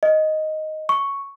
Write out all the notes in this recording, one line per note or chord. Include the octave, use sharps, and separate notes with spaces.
D#5
C#6